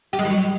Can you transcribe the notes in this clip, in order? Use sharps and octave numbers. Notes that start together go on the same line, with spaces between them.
G4
G#3
E3
F#3